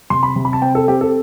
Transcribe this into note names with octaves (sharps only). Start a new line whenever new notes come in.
C3 C6
B5
C3
B5
A5
C4 G5
A4
C4 G4
A4